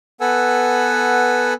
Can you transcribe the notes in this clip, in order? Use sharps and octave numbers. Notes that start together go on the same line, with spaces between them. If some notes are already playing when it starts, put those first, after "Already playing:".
B3 A4 B4 F#5 G#5 E6